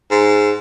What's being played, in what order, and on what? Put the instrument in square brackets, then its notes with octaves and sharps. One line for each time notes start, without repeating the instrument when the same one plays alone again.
[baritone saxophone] G#2